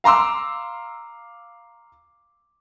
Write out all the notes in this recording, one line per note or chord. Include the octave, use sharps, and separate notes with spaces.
F5 A#5 C6 D6 E6